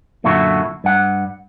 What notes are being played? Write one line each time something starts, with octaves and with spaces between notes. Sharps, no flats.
F#2 A#2 D3 E4 F#4
G2 F#5